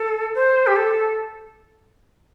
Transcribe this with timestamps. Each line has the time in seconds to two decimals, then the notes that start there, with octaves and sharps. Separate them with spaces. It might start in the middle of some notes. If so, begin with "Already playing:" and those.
Already playing: A4
0.35 C5
0.67 G4
0.76 A4